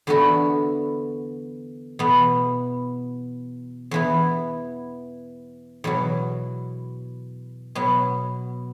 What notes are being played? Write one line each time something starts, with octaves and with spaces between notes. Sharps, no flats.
E2 D3 B3 F#4 A4
E2 B2 B3
E2 E3 B3
E2 B2 F#3
B2 F#3 B3